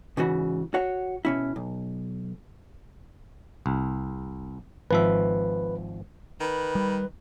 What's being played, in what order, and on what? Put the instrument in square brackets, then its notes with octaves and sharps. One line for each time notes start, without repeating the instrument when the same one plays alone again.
[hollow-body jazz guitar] G#2 C#3 E3 F#4
F#4 C#5 F#5
B2 C#4 E4
B1
[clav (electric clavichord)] C2
[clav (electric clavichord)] G#1 F3 E5 [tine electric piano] B4
[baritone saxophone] D#3 [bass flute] B4 [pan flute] B5
[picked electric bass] G3